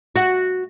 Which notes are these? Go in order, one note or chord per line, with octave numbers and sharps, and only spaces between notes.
F#4